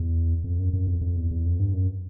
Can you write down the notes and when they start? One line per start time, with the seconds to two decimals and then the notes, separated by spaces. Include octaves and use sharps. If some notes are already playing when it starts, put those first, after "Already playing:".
Already playing: E2
0.44 F2
0.59 F#2
0.73 F#2
0.87 F2
1.01 F2
1.16 E2
1.31 E2
1.45 F2
1.60 G2
1.74 F#2